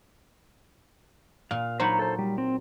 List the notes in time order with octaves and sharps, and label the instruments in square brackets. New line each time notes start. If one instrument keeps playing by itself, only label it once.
[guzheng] A#2 [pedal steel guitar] F5
[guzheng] F#3 D#4 F4 [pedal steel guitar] C5 C#5 B5
[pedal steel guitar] A4 C5
G3
C4